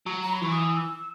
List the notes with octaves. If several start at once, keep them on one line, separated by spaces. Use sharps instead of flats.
F#3
A#5
B5
E3 C#6
D#6
E6